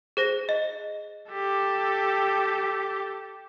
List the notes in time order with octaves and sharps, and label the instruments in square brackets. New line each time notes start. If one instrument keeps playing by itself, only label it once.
[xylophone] G#4 C5 A#6
D#5
[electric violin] G4 A4